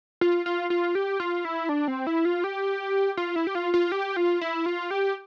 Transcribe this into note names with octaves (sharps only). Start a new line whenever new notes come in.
F4
F4
F4
G4
F4
E4
D4
C4
E4
F4
G4
F4
E4
G4
F4
F4
G4
F4
E4
F4
G4